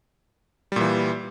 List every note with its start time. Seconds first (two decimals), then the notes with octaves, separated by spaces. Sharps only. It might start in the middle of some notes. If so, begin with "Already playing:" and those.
0.72 G3
0.76 A#2
0.80 E3